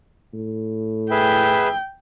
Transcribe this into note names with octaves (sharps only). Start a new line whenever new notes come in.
A2
G#4 B4 E5 G5